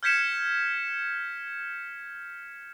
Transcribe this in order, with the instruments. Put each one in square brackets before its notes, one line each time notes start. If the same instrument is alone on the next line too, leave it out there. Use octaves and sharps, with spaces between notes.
[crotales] F6 G6 G#6 B6 C#7 E7